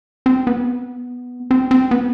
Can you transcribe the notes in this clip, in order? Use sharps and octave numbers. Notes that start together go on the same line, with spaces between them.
C4
B3
C4
C4
B3